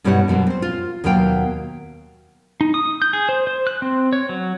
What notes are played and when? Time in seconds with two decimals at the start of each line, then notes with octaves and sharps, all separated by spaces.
0.04 G2 B2 G3 E4 C#5 F#5
0.28 F#2 B2 F3 F#3
0.47 C4 C5
0.62 F4
1.04 D#2 B2 F#3 F5 G5
2.61 D#4
2.74 D#6
3.02 G6
3.13 G#4
3.29 C5
3.47 C5
3.67 F#6
3.82 C4
4.13 C#5
4.29 F#3